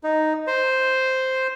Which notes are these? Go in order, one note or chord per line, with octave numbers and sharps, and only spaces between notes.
D#4
C5